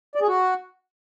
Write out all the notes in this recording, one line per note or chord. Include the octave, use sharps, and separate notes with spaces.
D5
G#4
F#4